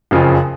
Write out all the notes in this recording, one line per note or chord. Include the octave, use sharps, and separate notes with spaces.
F#1 F2 C#3 F3